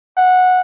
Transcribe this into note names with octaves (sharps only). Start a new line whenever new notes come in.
F#5